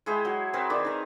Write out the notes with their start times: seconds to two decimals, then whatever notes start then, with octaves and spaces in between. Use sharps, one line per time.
0.06 G#3 E4 G#4 G5
0.25 F#3
0.53 C4 A#4 B4 G#5
0.70 D#3 E4 D5
0.85 D#3 A#5